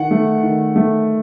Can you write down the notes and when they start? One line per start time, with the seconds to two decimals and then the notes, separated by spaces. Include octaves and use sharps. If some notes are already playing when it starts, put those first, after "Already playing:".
Already playing: D#3 F#5
0.11 A3
0.43 D#3
0.76 A3